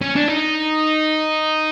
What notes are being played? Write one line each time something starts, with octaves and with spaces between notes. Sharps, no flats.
C#4
D4
D#4